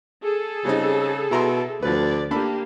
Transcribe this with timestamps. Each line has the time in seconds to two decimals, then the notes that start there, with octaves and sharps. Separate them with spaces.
0.23 G#4 A4
0.65 C#3 G3 C4 D#4
1.31 B2 E4 A#5 C6
1.82 D2 F3 B4 D5
2.31 A#3 D4 G4 A4 B5